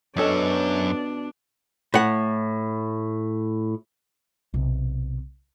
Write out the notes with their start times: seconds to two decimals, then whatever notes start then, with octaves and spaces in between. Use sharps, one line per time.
0.16 F#2 B2 C#4 D4 A4 C#5 A5
1.94 A2 F#5
4.54 B1 C3